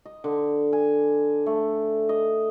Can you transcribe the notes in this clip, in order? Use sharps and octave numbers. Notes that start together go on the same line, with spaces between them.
D#5
D3
G#5
A3
D#5